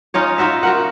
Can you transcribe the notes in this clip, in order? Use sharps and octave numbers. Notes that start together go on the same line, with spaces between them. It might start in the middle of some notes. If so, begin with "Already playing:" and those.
C#4 D#4 F4 C#5
D#4 F4 F#4 E5
F#4 A#4 F#5